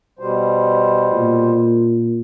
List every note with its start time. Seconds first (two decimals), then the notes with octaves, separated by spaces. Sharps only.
0.19 B2 G3 C5
1.11 A#2